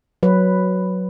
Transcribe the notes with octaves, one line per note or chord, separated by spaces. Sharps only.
F#3 B4